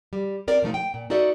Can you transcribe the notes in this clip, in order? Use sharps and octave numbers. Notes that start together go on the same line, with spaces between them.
G3
C4 A#4 D5
B2 F3 A3 D#4
G5
A#2
D#4 F#4 A4 D5 E5